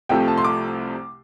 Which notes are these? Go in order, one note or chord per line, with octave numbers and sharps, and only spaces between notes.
C2 C3 F3 A3 G5
A5
C6
D6